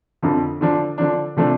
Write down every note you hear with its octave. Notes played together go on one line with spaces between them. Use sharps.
F2 D3 F3
D3 F3 D4
D3 F3 D4
C3 F3 A3 D4